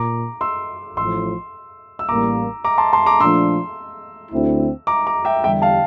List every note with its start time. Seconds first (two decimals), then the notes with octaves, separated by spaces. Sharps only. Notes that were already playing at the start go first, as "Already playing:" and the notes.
Already playing: A#2 A#5 D6
0.41 C6 E6
0.97 A1 A2 F3 C6 E6
1.99 E6
2.09 A1 A2 G3 A#3 A#5 D6
2.64 A#5 D6
2.78 A5 C6
2.93 A5 C6
3.06 A#5 D6
3.20 A#2 F3 A3 D4 F4 C6 E6
4.32 D2 D3 A3 C4 E4
4.87 A#5 D6
5.07 A#5 D6
5.25 E5 G5
5.44 E2 D3 G3 E5 G5
5.62 F5 A5